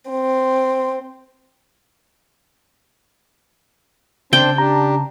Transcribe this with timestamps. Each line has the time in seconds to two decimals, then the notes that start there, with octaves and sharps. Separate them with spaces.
0.11 C4
4.33 C#3 C4 D4 C5 G5 A5
4.58 D4 G4 A#5